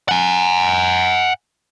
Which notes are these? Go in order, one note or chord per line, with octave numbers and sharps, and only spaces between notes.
F#5 G#5